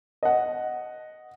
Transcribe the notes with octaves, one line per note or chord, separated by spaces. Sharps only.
D#5 F#5